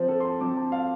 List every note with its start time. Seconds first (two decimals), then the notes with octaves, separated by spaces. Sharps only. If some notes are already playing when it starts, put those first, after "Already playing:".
Already playing: F3 C4 C5
0.08 A4
0.20 C6
0.25 A5
0.40 F3 C4 D6
0.57 A5
0.72 F5